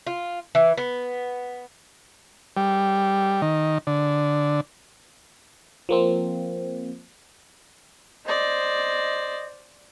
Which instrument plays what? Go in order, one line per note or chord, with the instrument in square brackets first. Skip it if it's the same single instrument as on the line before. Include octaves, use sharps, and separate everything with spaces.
[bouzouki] F4
E3
B3
[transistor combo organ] G3
D#3
D3
[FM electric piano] F3 A#3 C4
[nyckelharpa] C5 D5 [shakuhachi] D#5